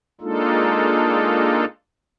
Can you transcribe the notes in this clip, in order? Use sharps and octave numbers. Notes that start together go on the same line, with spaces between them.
G#3 A#3 D4 D#4 F4 A4